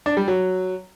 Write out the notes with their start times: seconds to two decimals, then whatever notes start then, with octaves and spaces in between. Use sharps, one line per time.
0.06 D4
0.17 G3
0.28 F#3